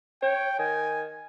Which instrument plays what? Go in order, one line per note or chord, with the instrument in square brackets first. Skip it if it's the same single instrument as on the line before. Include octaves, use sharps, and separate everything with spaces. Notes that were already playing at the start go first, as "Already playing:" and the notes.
[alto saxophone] C#5 [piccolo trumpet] G5
[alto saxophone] D#3 [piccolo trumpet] G#5